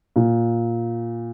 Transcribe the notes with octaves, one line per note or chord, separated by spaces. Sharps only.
A#2